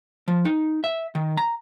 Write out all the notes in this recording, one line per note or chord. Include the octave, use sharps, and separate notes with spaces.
F3
D#4
E5
D#3
A#5